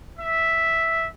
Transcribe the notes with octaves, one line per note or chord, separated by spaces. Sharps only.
E5